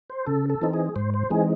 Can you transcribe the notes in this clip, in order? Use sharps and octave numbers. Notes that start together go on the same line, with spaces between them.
C5
C#3 A4
A4
E3 C4 D#4
G#4
G#2 C5
C5
E3 G#3 C4 D#4 G#4